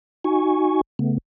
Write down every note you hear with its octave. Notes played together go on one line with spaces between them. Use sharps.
D#4 F#4 G#5 C#6
C#3 A3 B3